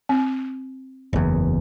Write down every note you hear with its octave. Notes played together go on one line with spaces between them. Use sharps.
C4
F#1 E2